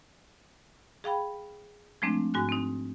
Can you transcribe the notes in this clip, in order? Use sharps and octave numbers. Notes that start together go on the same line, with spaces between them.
G#4 F5 G5 B5
F3 G#3 A3 C4 D4
G#2 F#4 G#5 F#6
C4 D#4